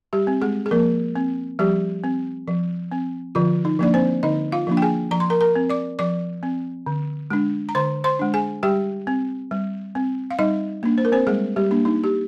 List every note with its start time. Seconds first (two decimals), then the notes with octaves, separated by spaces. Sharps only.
0.13 G3 G4
0.27 C4
0.42 G#3 G#4
0.66 G#4
0.71 F3 A#3 A#4
1.16 C4
1.59 F3 G3 G4
2.04 C4
2.48 F3
2.92 C4
3.35 D3 F3 F4
3.65 D#4
3.79 F3 A#3 D4 D5
3.94 C4 C5
4.23 D3 D#4 D#5
4.52 F4 F5
4.67 F3 A#3 D4
4.77 G5
4.82 G#4 G#5
5.11 F3 A#5
5.20 C6
5.30 A#4 A#5
5.41 A#4 A#5
5.56 C4
5.69 D5 D6
5.99 F3 D5 D6
6.43 C4
6.86 D3
7.30 G#3 D4
7.69 A#5
7.75 D3 C5 C6
8.04 C5 C6
8.19 G#3 D4
8.34 G#4 G#5
8.63 G3 G4 G5
9.07 C4
9.51 G3
9.95 C4
10.31 F5
10.39 G3 D#4 D#5
10.83 A#3 D4
10.98 C5
11.05 A#4
11.12 C4 C5
11.27 G3 G#3 G#4
11.56 G3 G4
11.71 A#3 D4
11.85 D#4
12.04 G4